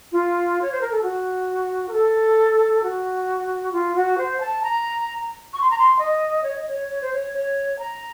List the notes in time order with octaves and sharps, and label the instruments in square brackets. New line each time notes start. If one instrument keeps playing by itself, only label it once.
[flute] F4
C#5
C5
A#4
A4
F#4
A#4
A4
F#4
F4
F#4
C5
A5
A#5
C#6
C6
A#5
C6
D#5
C#5
D#5
C#5
C#5
C5
C#5
C#5
A#5